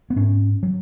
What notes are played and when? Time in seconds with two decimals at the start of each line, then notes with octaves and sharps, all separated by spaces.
0.10 B3
0.16 G#2 C#4
0.63 F#3